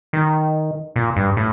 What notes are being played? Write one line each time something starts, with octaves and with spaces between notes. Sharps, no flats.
D#3
A#2
G2
A2